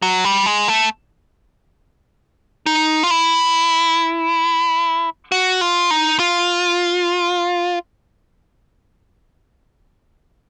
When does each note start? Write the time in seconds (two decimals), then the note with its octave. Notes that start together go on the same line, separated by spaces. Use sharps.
0.02 F#3
0.24 G3
0.46 G#3
0.68 A3
2.66 D#4
3.03 F4
3.11 E4
5.32 F#4
5.61 F4
5.90 D#4
6.19 F4